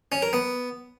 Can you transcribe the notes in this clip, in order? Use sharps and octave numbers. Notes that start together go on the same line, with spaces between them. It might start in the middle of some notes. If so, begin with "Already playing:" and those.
C#4
A#4
B3